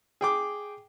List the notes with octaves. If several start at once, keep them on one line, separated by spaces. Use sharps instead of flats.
G#4 G5 D6